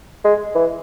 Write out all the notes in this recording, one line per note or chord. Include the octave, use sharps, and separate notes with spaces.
G#3
E3